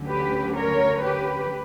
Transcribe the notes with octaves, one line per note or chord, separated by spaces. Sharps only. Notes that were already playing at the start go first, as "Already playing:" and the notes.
Already playing: D2 D3 F#3 C#4
G4 B4
A#4 C#5
G4 B4